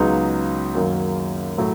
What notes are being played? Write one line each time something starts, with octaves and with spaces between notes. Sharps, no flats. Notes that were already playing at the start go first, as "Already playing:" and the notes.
Already playing: C#2 C#3 F#3 B3 D#4
F#2 D#3 F#3 A#3
A2 F#3